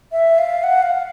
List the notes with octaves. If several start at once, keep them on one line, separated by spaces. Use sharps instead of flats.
E5
F5
F#5
F5